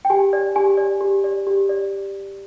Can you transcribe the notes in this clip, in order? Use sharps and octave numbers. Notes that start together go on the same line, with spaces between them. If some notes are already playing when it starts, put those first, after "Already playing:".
G5
G4 G#5
D5
G4 G#5
D5
G4
D5
G4
D5